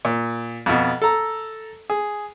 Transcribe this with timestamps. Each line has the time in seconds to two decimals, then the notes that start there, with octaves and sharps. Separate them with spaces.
0.05 A#2
0.66 F2 B2
1.02 A4 A#5
1.90 G#4